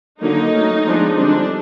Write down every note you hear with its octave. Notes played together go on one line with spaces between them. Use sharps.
D3 F#3 A#3 D#4
F#3 A3 C#4
F3 G#3 B3 D4
D3 G3 C4 D4